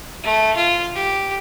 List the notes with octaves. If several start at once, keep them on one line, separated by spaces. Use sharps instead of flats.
A3
F4
G4